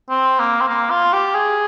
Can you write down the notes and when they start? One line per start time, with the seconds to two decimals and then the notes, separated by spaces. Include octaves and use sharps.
0.10 C4
0.39 A#3
0.61 C4
0.68 A#3
0.90 F4
1.13 G4
1.34 G#4